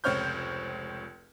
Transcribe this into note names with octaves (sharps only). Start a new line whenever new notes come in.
F1 C#2 C4 C#5 F6 G6